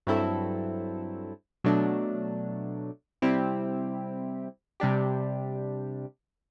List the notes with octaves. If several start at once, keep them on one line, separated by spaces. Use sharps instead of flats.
G2 F#3 C4 E4 A4
B2 F#3 A3 D4
C3 G3 C4 E4 G4
C3 G3 D4 G4